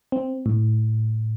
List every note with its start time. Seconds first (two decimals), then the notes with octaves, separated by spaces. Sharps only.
0.12 C4
0.46 A2